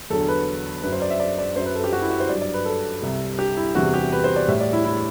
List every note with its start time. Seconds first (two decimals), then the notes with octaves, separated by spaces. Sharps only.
0.10 E2 D3 F#3 A4
0.28 B4
0.83 F#2 F#3 B4
0.92 C5
1.02 D5
1.10 E5
1.20 D5
1.38 D5
1.56 F#2 C5
1.59 F#3
1.66 B4
1.75 A4
1.84 G4
1.93 F#4
2.02 E4
2.11 F#4
2.20 C5
2.29 G2 F#3 D5
2.42 D5
2.54 B4
2.65 A4
3.02 C2 C3 G3
3.39 G4
3.57 E4
3.75 E2 C3 E3 G3 F#4
3.94 G4
4.12 B4
4.24 C5
4.36 D5
4.48 A2 G3 E5
4.60 D5
4.73 E4
4.85 E4